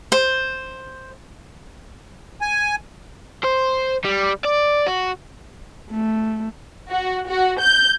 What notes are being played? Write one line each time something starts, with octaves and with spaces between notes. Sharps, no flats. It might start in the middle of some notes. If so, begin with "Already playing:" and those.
C5
G#5
C5
G3
D5
F#4
A3
F#4
F#4
G6